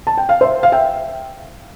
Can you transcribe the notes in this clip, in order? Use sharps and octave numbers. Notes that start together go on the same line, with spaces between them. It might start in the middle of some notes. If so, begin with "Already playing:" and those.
A5
G5
F5
C5 E5
F5
E5 G5